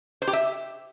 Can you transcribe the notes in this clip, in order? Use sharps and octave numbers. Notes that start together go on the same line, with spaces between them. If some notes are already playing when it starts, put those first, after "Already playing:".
C5
G4
E5